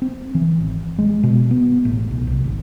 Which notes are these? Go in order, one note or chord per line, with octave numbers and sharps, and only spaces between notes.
C4
E3
G#1
G#3
B2
B3
A1
B1
C2
G#1